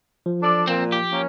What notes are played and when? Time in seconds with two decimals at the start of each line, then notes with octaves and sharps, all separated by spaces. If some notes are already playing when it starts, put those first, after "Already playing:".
0.26 F3
0.42 D4 A4 D5
0.67 A#2 C4
0.92 G4
1.12 A#3 C#4